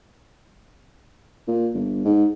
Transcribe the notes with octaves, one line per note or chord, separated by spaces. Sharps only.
A#2
G1
G#2